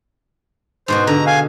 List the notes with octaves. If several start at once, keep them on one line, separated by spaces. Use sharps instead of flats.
G#2 B2 F#4 C5
D3 A#5
F5 G#5